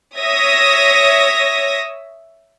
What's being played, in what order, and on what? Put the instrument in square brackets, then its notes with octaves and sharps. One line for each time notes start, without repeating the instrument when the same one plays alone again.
[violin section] C#5 E5 D#6 A#6